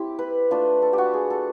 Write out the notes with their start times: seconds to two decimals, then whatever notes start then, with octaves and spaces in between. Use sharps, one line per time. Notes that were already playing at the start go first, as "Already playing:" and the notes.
Already playing: C4 E4 G4
0.19 B4
0.51 A3 D4 F4 B4
0.82 A4
0.93 G4
0.98 F#4
1.14 G#4
1.30 A4